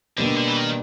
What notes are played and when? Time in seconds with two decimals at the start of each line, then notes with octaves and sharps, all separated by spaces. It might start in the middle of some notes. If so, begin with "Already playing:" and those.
0.18 B2 D3 G3 A#3 D4
0.37 D3
0.48 E3
0.57 D#3